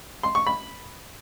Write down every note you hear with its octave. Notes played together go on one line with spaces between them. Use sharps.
C6
C#6
B5